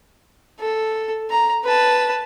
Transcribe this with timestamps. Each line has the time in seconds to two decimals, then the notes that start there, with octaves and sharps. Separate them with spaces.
0.60 A4
1.30 A#5
1.65 B4 A5